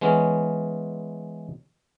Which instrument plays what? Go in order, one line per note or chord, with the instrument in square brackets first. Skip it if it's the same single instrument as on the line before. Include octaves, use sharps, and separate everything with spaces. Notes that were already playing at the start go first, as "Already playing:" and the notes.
[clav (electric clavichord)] E3 G#3 B3 C#4